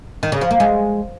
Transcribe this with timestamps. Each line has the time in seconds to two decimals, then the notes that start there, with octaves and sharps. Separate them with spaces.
0.23 D#3
0.32 C#3
0.41 F3
0.51 A#3
0.60 G#3